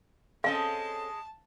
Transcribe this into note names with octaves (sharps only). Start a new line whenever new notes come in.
G#3 C4 C#4 A4 D#5 F5 A5